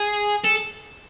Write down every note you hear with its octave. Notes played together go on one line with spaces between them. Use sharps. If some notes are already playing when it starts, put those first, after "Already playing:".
Already playing: G#4
A4